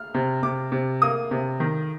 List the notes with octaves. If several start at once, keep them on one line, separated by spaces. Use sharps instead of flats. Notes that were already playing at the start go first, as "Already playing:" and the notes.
Already playing: F6
C3
C3 D6
C3
A#3 D#6
C3
D#3